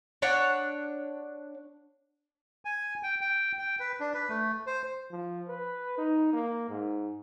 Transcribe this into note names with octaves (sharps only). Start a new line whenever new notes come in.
D4 C#5 F#5
G#5
G5
G5
G5
B4
D4
B4
A3
C5
F3
B4
D#4
A#3
G#2